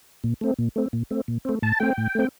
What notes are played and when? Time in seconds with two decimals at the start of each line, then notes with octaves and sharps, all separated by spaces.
0.24 A#2
0.41 A3 C4
0.59 A#2
0.76 A3 C4
0.93 A#2
1.11 A3 C4
1.28 A#2
1.45 A3 C4
1.62 A2 A5
1.80 A3 C4 G5
1.98 A2
2.15 A3 C4